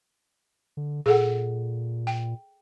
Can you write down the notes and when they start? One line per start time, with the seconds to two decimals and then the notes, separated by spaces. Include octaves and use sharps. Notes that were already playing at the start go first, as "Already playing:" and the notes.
0.77 D3
1.06 A#2 G#4 A4 F#5
2.07 G5